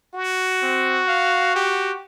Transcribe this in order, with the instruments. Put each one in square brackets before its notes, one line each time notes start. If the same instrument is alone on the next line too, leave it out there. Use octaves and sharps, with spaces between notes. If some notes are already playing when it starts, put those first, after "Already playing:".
[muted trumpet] F#4
[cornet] C4
F5
G4